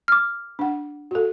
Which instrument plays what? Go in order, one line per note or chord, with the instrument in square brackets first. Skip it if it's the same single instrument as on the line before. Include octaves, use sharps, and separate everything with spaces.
[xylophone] D6 F6
[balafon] D4 F#5
F#4 A4